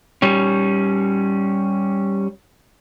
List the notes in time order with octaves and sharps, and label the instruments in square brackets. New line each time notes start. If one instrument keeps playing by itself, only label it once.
[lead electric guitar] G3 C#4